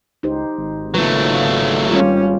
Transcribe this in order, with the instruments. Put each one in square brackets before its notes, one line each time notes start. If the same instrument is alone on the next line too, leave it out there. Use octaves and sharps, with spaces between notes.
[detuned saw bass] C#2 [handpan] D#4 G4 C5
[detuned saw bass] G#1
[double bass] C#3 [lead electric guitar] F#3 A3 [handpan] A#3 F4 B4
[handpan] F5
[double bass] G3 C#4 [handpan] F4 G4